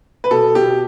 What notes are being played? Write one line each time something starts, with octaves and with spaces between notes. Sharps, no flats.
B4
B2 A4
B2 G4